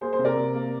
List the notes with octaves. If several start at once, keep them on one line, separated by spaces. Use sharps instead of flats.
A#3 G#4 C5
G#4 C5
C3
A#4 D5
C3
A#3